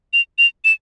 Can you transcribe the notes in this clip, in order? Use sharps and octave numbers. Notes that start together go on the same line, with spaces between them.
F7
F7
E7